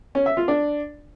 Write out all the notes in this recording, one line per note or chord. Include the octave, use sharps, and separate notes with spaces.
C#4
E5
F4
D4